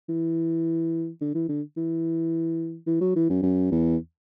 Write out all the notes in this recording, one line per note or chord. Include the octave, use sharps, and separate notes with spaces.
E3
D3
E3
D3
E3
E3
F#3
E3
F#2
F#2
E2